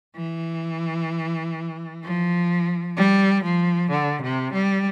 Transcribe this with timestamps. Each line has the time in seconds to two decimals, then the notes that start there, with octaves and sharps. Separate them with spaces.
0.16 E3
2.04 F3
2.97 G3
3.44 F3
3.91 D3
4.22 C3
4.53 G3